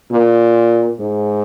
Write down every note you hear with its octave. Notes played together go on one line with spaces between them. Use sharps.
A#2
G#2